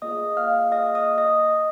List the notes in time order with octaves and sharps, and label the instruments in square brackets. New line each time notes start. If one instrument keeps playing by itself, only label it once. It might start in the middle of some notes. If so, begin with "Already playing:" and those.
[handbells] A#3 F4 G#4 D#5 D#6
F5 F6
D#5 D#6
D#5 D#6
D#5 D#6